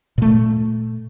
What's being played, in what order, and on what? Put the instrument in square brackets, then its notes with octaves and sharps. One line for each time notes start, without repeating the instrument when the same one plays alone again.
[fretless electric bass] A#2 A3